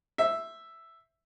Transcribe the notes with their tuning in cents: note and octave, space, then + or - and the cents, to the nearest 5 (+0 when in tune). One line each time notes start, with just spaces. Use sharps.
C5 +15 E5 +0